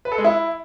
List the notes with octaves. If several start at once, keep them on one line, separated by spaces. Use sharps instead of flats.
B4
A4
G#3
E4